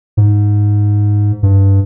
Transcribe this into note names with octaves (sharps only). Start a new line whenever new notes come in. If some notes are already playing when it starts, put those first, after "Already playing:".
G#2
G2